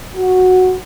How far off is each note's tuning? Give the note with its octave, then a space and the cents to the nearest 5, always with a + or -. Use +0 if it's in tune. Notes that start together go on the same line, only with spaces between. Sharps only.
F#4 -5